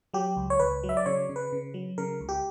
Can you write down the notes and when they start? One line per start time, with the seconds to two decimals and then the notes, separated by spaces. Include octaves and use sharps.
0.14 F#3 G4
0.37 C#2
0.50 C#5
0.60 C#2 B4
0.83 F#3
0.89 E5
0.97 D5
1.06 C#3 C#5
1.29 C#3
1.36 B4
1.52 C#3
1.74 F#3
1.98 C#3 A#4
2.21 C#2
2.29 G4